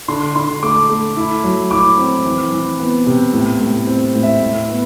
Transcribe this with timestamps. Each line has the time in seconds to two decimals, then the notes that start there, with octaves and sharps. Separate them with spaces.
0.08 D3 C6
0.36 D3 C6
0.62 A3 D6
0.89 A3
1.17 E4
1.44 F#3
1.71 E4 D6
1.98 C4
2.25 E3
2.52 E3
2.79 B3
3.07 C3
3.33 A2
3.60 A2
3.87 C4
4.14 A2
4.23 E5
4.41 A2
4.68 B3